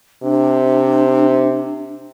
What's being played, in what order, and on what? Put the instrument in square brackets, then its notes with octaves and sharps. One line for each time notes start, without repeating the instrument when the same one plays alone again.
[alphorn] C3 [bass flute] D4